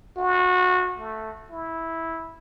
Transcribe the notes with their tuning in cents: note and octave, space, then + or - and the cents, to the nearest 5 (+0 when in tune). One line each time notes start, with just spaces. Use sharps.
F#4 -25
A3 +0
E4 -10